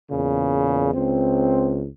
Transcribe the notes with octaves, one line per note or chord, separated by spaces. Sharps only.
E2 A#2 C#3
C#2 C4